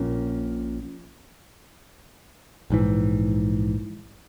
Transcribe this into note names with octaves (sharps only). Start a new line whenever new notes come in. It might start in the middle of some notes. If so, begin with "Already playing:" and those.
Already playing: A#1 A#2 A#3 C#4
A#1 G#2 E3